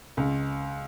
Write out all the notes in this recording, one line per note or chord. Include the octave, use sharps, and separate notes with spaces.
C#2